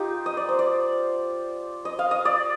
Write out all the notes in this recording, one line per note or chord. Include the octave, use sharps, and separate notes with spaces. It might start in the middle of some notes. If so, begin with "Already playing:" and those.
Already playing: D#4 F4 G4 A#4
D#5
D5
C5
D5
D#5
F5
D#5
D5